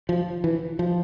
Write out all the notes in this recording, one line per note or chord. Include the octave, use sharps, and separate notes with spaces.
F3
E3
F3